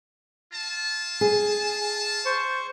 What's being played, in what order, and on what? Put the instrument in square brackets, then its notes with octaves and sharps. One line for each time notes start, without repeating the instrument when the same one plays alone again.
[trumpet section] F4 A5
[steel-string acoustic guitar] G#4
[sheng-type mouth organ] C5 C#6